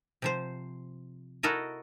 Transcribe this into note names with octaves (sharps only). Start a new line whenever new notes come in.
C3 F3 C5
E4 F#4 A4 A#4 D#5